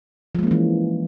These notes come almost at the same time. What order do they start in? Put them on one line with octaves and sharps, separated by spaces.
F3 G#3 A#3 C#4 E3